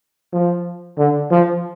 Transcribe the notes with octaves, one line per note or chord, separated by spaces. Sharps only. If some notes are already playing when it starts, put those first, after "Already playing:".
F3
D3
F3